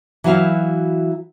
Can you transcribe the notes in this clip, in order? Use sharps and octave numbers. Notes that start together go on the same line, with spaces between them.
E3 F#3 E4 F#4 F5